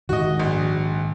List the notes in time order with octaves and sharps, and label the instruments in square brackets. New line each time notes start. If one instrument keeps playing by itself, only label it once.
[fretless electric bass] G#2 D#3 [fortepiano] F#4 D#5
[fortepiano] A#1